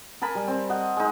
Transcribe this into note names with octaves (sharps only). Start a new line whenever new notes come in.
A#4 G#5 A5 B5
G3
C4
D#5 F#5
G#3 D#4